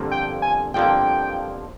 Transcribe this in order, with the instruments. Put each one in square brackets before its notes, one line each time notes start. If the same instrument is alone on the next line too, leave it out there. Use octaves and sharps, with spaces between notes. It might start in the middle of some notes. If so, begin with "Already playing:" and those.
Already playing: [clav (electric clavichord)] G1 F2 D3 F3 A#3
[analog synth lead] G5
G#5
[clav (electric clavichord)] G1 F2 D3 F3 A#3 [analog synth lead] G5